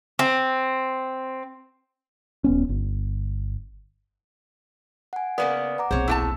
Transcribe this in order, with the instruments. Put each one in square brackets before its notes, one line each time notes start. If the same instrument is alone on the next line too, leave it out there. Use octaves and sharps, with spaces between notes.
[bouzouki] C4
[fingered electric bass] D#1 B3 C#4
G1
[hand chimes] F#5 G#5
[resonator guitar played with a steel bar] C#3 A#3 B3 [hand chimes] B4 D5 D#6
[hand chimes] F#5 A#5 D6
[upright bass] D#1 B1 [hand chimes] C4 G#4 [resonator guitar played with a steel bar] C5 C#5
[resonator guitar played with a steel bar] A2 D4 A5 [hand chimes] E6